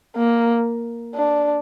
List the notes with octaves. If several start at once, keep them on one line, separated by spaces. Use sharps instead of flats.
A#3
D4